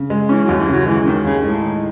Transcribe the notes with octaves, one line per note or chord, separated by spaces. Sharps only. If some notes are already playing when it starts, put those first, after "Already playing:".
Already playing: C#3
G#3
E3 C#4
D#2 F#3
E3
C#3 F#3
E3 G#3
D#3 C#4
D#2 C#3
A2 G#3
D#4